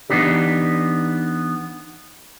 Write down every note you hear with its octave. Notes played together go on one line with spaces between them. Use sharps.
E3 A#3 B3 D4 D#4 G4